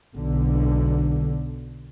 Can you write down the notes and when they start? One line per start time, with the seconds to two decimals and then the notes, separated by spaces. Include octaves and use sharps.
0.16 B1 D3